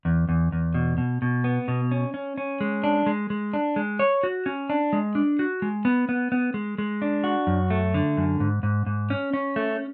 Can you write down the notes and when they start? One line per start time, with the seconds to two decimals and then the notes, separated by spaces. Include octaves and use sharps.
0.05 E2
0.29 E2
0.52 E2
0.74 B2
0.98 B2
1.22 B2
1.44 B3
1.68 B2
1.91 C#4
2.14 C#4
2.38 C#4
2.61 G#3
2.84 D4
3.06 G#3
3.30 G#3
3.53 D4
3.76 G#3
3.99 C#5
4.23 F#4
4.46 C#4
4.70 D4
4.93 G#3
5.15 D4
5.39 F#4
5.62 G#3
5.85 B3
6.09 B3
6.32 B3
6.54 G#3
6.78 G#3
7.02 D4
7.24 F#4
7.47 F#2
7.70 A3
7.94 D3
8.17 F#2
8.40 G#2
8.63 G#2
8.86 G#2
9.10 C#4
9.34 C#4
9.56 A3